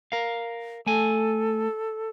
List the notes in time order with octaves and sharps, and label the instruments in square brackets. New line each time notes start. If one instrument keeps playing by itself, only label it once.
[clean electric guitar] A#4 F5
[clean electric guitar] A3 G#5 [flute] A4